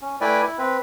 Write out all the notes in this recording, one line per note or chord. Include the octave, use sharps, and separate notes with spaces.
C#4
A3 E4 B4 D5 G5 G#5
E4
C4 B4